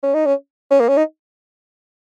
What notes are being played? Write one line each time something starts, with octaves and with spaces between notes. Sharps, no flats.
C#4
D#4
C#4
C#4
A#3
C#4
D#4